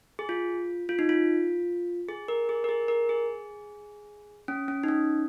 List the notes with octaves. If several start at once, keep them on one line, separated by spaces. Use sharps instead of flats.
G#4
F4
F4
D#4
F4
G#4
A#4
G#4
A#4
G#4
A#4
G#4
C#4
C#4
D#4
C#4